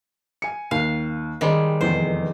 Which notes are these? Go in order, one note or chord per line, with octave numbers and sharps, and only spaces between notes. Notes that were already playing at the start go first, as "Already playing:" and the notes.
G#5 C#7
D#2 F5
D#3 G3 G#3 G#4 C5
F1 E2 C5